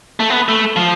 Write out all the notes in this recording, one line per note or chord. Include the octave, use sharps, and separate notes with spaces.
A3
B3
A3
F3